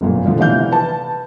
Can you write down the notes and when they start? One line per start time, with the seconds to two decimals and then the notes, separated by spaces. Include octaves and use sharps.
0.01 G1 F#2 A#2
0.25 B2 D3 F3 A3
0.38 C3 E3 D5 F5 G6
0.72 B4 A5